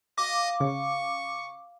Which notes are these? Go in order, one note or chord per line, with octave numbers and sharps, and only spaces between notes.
F#4 D#5 F5 D6
C#3 F5 C#6